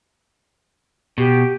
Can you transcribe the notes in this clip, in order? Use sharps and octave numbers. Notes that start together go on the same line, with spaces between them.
B2 G4